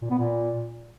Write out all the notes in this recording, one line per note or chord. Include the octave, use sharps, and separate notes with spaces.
A#2
B3
A#2